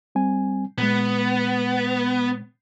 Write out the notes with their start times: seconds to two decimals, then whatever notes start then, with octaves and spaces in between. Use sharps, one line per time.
0.15 G3 C4 G#5
0.78 A#2 G#3 B3